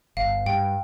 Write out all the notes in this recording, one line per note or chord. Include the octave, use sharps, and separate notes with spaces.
G1 F5
G2 G5